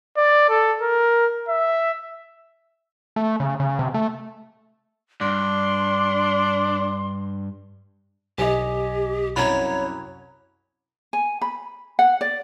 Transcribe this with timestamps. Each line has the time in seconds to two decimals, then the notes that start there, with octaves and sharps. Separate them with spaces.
0.17 D5
0.49 A4
0.82 A#4
1.49 E5
3.16 A3
3.40 C#3
3.60 C#3
3.79 C3
3.94 A3
5.21 G2 D4 C6
8.38 B1 G4 D#5 G#5
9.36 C2 F#2 C#5 A#5 B5
11.13 G#5
11.41 B5
11.99 F#5
12.21 D5